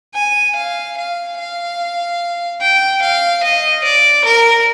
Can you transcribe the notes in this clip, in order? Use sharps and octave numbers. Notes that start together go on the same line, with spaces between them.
G#5
F5
F5
F5
G5
F5
D#5
D5
A#4